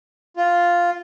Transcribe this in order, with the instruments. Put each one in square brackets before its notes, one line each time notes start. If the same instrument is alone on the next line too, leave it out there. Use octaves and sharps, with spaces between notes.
[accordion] F4